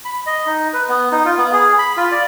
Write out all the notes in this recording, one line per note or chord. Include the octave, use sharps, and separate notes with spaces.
B5
D#5
D#4
B4
B3
D#4
F4
B3
G#4
B5
F4
D5